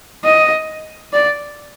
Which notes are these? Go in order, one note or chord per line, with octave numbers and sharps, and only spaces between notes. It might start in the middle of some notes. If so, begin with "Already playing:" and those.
D#5
D5